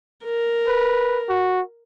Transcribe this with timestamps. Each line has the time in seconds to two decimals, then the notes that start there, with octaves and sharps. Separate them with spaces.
0.24 A#4
0.68 B4
1.29 F#4